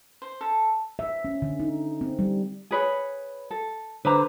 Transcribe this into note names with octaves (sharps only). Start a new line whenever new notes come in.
C5
A4
E5
C#4
D3
D#4
C4
G3
G#4 B4 C#5
A4
D3 B4 C5 A#5